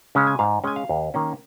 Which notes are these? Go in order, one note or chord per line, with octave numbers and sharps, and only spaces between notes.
C#3 G#3 C#4
G#5
G#2 F5
G#3 C#4 G#5
F5
D#2
D#3 A#3 C#4